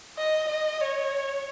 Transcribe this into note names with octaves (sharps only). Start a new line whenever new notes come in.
D#5
D#5
C#5